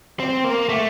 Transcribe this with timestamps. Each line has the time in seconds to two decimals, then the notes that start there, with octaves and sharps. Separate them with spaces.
0.20 C4
0.44 A#3
0.69 A3